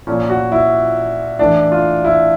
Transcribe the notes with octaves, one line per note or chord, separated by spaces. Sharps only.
A#2 F3 C#4
F#4
E4
A2 E3 D4
F4
E4